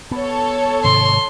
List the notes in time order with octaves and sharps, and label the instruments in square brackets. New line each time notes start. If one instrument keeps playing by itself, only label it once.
[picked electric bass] B3 [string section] A4 C#5
[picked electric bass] G#2 C3 D#3 [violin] C6